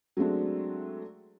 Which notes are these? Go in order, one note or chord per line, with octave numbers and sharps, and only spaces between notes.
F#3 G#3 A3 C4 D4